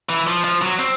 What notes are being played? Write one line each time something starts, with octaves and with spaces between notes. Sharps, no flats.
E3
F3
F3
F#3
C4